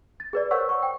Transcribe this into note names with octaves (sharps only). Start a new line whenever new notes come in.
A6
G#4 B4 D5
A#4 C5 C#5 F#5 C#6 E6
C#6
G5